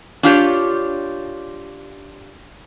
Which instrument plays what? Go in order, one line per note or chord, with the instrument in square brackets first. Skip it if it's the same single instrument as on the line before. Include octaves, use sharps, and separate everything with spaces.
[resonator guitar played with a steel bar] D4 F4 G4 C#5